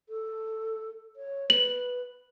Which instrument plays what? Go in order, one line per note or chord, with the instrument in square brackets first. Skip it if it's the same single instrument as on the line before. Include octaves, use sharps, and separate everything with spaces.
[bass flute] A4
C#5
[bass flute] B4 [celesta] F#7